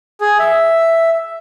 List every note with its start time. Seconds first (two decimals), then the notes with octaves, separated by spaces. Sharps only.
0.21 G#4
0.39 E5